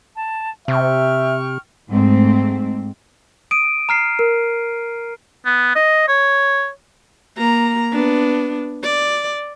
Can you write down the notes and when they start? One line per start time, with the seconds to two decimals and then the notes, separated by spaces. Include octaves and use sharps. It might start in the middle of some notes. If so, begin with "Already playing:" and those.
0.15 A5
0.68 C3 E5 G5 C#6 F6
1.90 G#2 A3 C4
3.51 D#6 D7 D#7
3.89 A#5 F6 C7
4.19 A#4
5.45 B3
5.75 D#5
6.08 C#5
7.38 A#3 A#5
7.93 B3 D4
8.83 D5